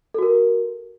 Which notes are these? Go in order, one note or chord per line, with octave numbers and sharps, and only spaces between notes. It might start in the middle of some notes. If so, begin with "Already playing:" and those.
F#4 A4 A#4